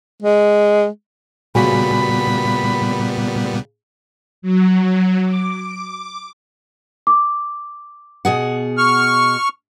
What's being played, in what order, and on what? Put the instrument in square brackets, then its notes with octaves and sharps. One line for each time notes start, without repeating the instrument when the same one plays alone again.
[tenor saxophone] G#3
[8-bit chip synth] A#2 G3 B3 [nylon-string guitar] C#3 F#4 G#5 [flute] B5
[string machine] F#3
D6
[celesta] D6
[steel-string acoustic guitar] B2 G#4 F#5
[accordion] C#6 F6